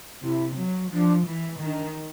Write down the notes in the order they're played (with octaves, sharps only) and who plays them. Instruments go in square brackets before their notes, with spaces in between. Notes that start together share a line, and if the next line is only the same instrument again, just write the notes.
[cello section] C3 [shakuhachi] E4
[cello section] F#3
[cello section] F3 [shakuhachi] D4
[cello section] E3
[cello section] D#3 [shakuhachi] D#4
[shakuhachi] D4